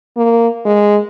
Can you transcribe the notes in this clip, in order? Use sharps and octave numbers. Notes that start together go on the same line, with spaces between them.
A#3
G#3